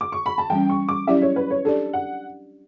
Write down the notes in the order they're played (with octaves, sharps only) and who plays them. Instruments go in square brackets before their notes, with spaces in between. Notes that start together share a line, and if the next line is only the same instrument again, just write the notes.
[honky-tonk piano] D6
C#6
B5
A5
[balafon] E3 G3 C#4 [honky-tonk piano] G5
[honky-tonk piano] C#6
D6
[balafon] F#3 C#4 E4 G4 D5 [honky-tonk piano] E5
[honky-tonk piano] C#5
B4
C#5
[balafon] D4 G4 D5 [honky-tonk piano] A4
[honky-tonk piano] F#5